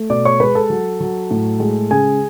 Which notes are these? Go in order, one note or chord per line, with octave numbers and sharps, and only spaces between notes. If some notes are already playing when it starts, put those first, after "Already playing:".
Already playing: A3
B2 D5 D6
C#5 C#6
G#3 B4 B5
A4 A5
F#3
F#3
A2
G#3
C#3 G#4 G#5